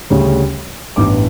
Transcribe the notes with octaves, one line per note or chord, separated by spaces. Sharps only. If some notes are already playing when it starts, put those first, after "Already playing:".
D2 C#3 G3 C#4
A1 G2 E3 B3 D6